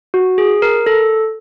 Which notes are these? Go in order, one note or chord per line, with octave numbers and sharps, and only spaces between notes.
F#4
G#4
A#4
A4